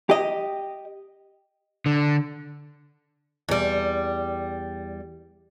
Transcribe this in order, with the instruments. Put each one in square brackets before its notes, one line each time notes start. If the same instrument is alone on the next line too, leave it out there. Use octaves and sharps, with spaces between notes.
[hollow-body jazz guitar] G4 D#5
[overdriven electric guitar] D3
[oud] E2 G3